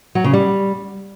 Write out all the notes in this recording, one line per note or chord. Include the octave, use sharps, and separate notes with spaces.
F#3
C#3
G3